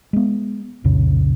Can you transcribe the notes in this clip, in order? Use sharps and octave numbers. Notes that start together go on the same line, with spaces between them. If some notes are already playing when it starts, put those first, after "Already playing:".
G#3 B3
C2 F2 A#2 C#3